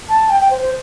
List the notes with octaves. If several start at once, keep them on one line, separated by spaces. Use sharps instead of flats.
A5
G5
G5
C5
C5